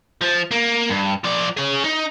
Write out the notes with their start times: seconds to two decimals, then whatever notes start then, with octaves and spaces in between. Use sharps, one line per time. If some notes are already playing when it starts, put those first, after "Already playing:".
0.21 F3
0.51 A#3
0.90 G2
1.24 F3 D5
1.57 G#4 C#5
1.84 D#4